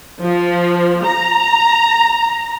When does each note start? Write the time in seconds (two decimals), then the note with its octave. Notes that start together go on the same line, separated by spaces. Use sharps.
0.22 F3
1.04 A#5